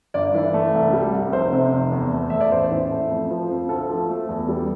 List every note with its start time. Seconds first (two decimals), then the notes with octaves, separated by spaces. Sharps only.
0.14 G1 D5
0.34 E3
0.54 A3
0.74 C2
0.93 G3
1.13 C2
1.32 F1 C5
1.52 C3
1.72 F1
1.92 E2
2.12 A3
2.30 E2 E5
2.41 D5
2.51 A1 C5
2.71 E3
2.91 A3
3.10 F2
3.30 F3
3.50 F2
3.69 D2 A4
3.89 F3
4.09 A3
4.29 E2
4.48 G3